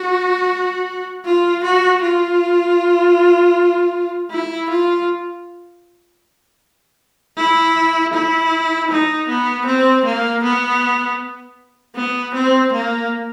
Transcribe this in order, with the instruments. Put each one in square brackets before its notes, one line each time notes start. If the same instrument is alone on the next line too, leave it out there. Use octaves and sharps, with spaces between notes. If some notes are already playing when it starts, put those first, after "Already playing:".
Already playing: [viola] F#4
F4
F#4
F4
E4
F4
E4
E4
D#4
B3
C4
A#3
B3
B3
C4
A#3